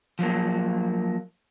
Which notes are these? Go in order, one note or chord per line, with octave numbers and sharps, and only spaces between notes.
F3 F#3 A#3